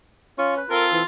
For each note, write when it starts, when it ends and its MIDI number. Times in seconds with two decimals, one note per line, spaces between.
0.38 0.60 61
0.38 0.55 65
0.38 0.55 85
0.57 0.70 71
0.70 1.03 60
0.70 1.05 65
0.70 1.03 69
0.70 0.86 70
0.93 1.01 52